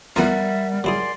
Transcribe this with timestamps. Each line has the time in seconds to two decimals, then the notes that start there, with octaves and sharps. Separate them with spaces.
0.16 F2 E3 G3 B3 A#4 E5 F#5
0.84 F#3 E4 G#4 D5 G#5 C6